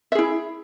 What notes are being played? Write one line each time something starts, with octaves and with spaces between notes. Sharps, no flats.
E4 G#4 E5